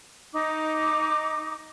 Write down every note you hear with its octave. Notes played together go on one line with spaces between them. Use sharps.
D#4 D6